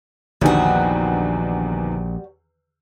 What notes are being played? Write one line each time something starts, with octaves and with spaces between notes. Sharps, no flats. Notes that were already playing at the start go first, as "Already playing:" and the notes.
A#1 E2 D3 D#3 G3 F#4